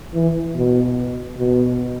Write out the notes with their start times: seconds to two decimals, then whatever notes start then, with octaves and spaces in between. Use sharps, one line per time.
0.14 E3
0.55 B2
1.37 B2